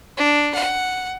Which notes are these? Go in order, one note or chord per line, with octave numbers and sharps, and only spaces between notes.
D4
F#5